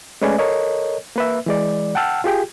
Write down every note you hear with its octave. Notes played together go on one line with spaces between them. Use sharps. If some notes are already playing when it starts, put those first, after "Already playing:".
G#3 A3 C#4 B4 D5 G#5
A4 A#4 C#5 D#5
A#3 B4 E5
E3 G#3 D5
F#5 G5 A5 E6 F6
F4 G4 G#4 G5